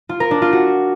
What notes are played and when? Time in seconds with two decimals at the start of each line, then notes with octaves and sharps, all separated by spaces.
0.09 F4
0.20 A#4
0.31 D4
0.42 F4
0.53 F#4